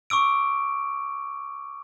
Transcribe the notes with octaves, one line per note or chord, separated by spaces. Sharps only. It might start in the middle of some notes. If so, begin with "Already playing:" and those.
C#6 D6 E6 D7